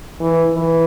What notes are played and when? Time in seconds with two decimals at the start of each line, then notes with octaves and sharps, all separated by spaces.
0.20 E3
0.53 E3